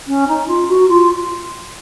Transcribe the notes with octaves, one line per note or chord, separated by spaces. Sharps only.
C#4
D#4
F4
F#4
F4